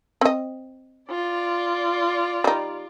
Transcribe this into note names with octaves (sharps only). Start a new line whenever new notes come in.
C4 D#5
F4 D5
G3 D#4